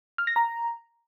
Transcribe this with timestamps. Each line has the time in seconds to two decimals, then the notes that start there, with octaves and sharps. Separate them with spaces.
0.18 F6
0.27 A#6
0.36 A#5